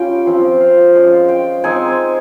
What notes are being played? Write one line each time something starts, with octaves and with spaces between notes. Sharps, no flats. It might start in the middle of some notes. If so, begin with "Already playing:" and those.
Already playing: G3 C#4 F4 G5
F3 C4 F4
F5
G#3 C#4 F4
G5
G#3 C4 D#4 G#5